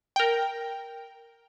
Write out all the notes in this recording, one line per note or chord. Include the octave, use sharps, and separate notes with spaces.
A#4 G5